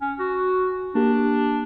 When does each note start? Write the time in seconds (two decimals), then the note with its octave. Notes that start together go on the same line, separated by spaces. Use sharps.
0.01 C#4
0.19 F#4
0.95 A#3 D4 G4